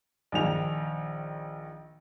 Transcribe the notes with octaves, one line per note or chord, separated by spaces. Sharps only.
A#1 D#3 F7